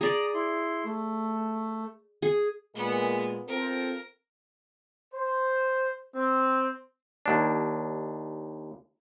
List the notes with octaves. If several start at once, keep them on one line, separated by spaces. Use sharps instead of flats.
G#4 D5 A#5 D#6
E4 C6
A3
G#4
A#2 G#3 A#3 B3
C4 F4 A4 A#4
C5
C4
D#2 D4